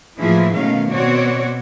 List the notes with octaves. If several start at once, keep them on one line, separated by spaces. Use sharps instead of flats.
A2 E3 F3 A#3 E4 G#4
B2 D#3 F#3 A3 C#4 F5
B2 C4 F#4 C#5 D5